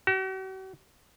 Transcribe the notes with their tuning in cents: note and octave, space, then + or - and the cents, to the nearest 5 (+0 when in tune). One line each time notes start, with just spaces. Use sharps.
F#4 +45